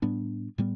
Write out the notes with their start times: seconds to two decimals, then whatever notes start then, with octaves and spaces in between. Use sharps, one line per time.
0.02 A2 G3 B3 D4
0.58 A2 G3 B3